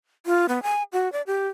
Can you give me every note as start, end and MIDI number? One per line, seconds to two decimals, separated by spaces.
0.26 0.46 65
0.49 0.62 59
0.63 0.83 80
0.93 1.11 66
1.12 1.22 74
1.27 1.48 67